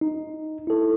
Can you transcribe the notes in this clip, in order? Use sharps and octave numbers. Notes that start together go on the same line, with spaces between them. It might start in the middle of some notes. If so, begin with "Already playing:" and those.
D#4
E4 A4